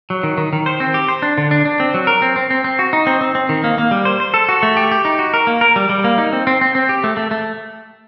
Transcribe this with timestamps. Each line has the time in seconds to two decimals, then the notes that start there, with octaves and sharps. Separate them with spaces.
0.10 F#3
0.23 D#3
0.38 D#3
0.53 D#3
0.66 C5
0.80 C4
0.94 G4
1.08 C5
1.22 D4
1.38 D3
1.51 D4
1.65 D4
1.80 C4
1.94 F#3
2.07 A#4
2.22 C4
2.36 C4
2.51 C4
2.64 C4
2.79 F#4
2.93 D#4
3.07 C4
3.21 C4
3.35 C4
3.49 D#3
3.64 A#3
3.78 A#3
3.91 G3
4.05 C5
4.20 C5
4.34 A4
4.49 F#4
4.63 A3
4.77 G4
4.91 G4
5.05 D#4
5.19 F#4
5.34 A#4
5.47 A#3
5.61 A#4
5.76 G3
5.89 G3
6.04 A#3
6.18 D#4
6.33 C4
6.47 C4
6.61 C4
6.75 C4
6.89 G4
7.04 A3
7.17 A3
7.31 A3